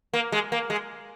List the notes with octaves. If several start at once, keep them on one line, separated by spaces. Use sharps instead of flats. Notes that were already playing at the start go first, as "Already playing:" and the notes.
A#3
G#3
A#3
G#3